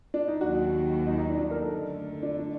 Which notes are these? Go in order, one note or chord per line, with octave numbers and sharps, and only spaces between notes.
D4
D#4
D#2 D#3 F#3 F#4
D#4
D#4
D4
D4
A#4
A4
F#2 D3 A3
D4
D4